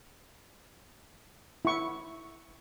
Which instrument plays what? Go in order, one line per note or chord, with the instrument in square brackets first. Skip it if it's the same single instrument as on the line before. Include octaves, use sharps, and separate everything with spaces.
[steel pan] E4 C#6